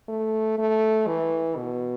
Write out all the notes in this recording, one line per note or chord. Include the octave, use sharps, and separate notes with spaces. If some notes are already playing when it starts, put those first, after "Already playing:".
A3
A3
E3
B2